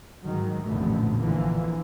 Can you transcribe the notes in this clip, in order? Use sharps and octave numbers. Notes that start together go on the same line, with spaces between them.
G#2 D#3 F#3
A1 F2 A#2 D3 A3 B3
A#1 D3 E3 F3 A#3